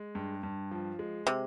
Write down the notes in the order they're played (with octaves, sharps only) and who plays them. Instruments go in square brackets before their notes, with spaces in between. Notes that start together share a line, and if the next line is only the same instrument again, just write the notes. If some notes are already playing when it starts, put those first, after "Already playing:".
Already playing: [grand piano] G#3
G2
G2
F3
G#3
[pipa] C3